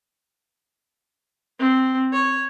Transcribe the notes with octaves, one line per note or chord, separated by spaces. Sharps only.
C4
C#5